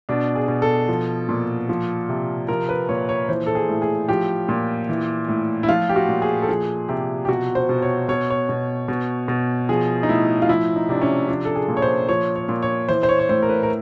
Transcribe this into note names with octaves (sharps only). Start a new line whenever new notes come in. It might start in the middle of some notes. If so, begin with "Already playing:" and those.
B2 D4
G#4
B2
A4
F3
A#2
F3
C3
F3 A#4
B4
A#2 C#5
C#5
E3 C5
A4
G#4
A2
G#4
F3 G4
A#2
E3
A2
E4
F3 F4
G4
F#4
A#2
G#4
A4
F3 G#4
C3 G4
G4
B2 F#4
C5
B2
C#5
B2 C#5
C#5
B2
B2
B2
F3 G#4
D#4
A2 E4
F4
F3 E4
D#4
C3 D4
C#4
F3 D4
A4
G#4
A#2
C#5
C5
F3 C#5
C#5
A#2
C#5
E3 C5
C5
C#5
C#5
A2 C5
A#4
B4
A#4